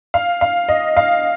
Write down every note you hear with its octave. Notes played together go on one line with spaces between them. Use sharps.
F5
F5
D#5
F5